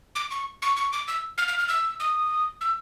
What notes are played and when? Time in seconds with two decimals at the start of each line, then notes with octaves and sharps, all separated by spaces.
0.15 D6
0.31 C#6
0.62 C#6
0.77 C#6
0.93 D6
1.08 E6
1.38 F6
1.48 F6
1.59 F6
1.68 E6
2.00 D#6
2.61 E6